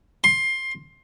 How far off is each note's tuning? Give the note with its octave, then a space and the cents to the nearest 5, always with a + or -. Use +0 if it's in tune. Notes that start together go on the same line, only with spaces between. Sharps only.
C6 +20